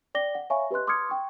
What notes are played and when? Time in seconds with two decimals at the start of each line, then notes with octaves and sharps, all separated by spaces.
0.15 D5 G5 D6 A#6 G7
0.35 F#5
0.50 C#5 E5 F5 G#5 B5 C#6
0.71 G4 B4 D#5 C6 F#6
0.87 C6 D6 D#6 F6 G#6 C#7
1.09 G5 C#6